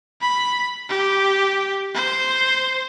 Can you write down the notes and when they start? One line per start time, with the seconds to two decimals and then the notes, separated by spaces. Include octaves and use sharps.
0.21 B5
0.90 G4
1.95 C5